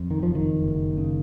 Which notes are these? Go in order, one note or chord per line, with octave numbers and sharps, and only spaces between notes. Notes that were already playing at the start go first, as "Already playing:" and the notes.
Already playing: F2
D#3
F#1 F3
D#3
F#1
C#3